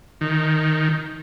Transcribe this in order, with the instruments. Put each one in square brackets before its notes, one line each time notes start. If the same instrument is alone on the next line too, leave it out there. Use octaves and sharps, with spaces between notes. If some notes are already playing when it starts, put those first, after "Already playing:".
[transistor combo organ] D#3